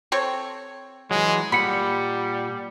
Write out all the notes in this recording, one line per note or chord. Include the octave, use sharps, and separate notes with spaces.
C4 A4 C#5
E3 F#3 G#3
A#2 G3 F#5 B5